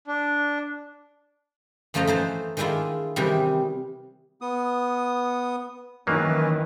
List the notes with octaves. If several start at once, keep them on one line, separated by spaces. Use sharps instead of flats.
D4
F#2 F3 A3 F4 D#5 A#5
E3 D#4 C5 A5
D#3 G#3 D4 E4 F4
C3 D#3 E3 G3
B3 D#6
D#3 E3 F#3 A#3 C#4 B4